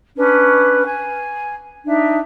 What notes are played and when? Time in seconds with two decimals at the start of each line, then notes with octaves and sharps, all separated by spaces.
0.16 C#4 D4 B4
0.85 G#5
1.85 D4 D#4 E5